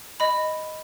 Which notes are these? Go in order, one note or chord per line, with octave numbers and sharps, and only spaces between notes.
D#5 B5